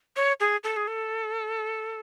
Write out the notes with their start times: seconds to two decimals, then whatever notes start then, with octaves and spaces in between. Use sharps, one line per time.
0.16 C#5
0.40 G#4
0.64 A4
0.76 G#4
0.87 A4